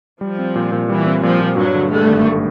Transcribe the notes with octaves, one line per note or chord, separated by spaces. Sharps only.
F3 G3
C4
A#2
A#2
E3 G3
C4
A#2 F3
A#2
G2 F#3
D3
G3 A3
G#1